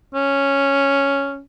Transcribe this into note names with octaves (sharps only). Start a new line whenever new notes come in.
C#4